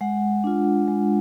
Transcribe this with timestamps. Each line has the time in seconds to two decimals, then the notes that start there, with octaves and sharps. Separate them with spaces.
0.01 G#3 F#5
0.44 D4 F4
0.88 G#3